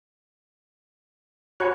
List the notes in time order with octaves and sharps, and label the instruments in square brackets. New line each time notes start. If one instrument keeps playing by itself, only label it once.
[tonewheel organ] F#4 C#5 [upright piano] G#5 B5 F#6